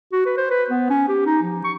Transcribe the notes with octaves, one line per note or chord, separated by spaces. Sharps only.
F#4
B4
C5
B4
B3
C#4
G4
D#4
F3
C#6